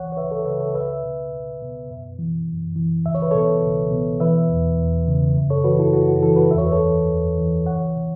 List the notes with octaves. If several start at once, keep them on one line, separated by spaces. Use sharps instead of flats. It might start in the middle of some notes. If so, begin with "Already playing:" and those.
Already playing: C#2 E3 C#5 F#5
C#5
C#2 B4 E5
A4 C#5
C#3 B4 E5
A4 C#5
C#2 B4 E5
B2
C#2
B2
F#2
E3
F#2
E3
C#2 E5
C#5
B4
B2 A4 C#5
C#2
B2
E3 B4 E5
E2
E2
C#3
F#2
A4 C#5
E3 F#4 B4
E4 A4
F#2 F#4
F#4
E3 E4 A4
F#4 B4
E2 E5
C#5
B4
A4 C#5
E3
E2
E3
C#2 C#5 F#5
B2